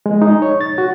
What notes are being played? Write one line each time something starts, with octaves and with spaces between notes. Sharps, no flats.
G#3
D#4
C#5
A6
F#4